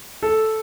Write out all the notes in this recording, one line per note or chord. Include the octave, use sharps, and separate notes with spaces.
A4